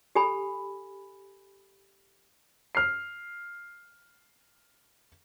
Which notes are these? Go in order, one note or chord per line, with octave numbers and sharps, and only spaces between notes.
G4 A4 G#5 B5
F6 C7